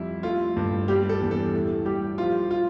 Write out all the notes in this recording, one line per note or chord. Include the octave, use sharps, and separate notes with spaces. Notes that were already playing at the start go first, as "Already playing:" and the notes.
Already playing: F2 G3 E4
A3 F4
G2
G3 G4
A4
E2
A4
A2
G3 G4
F3 F4
F4